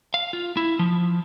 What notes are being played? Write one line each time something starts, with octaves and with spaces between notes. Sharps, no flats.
F5
F4
E4
F3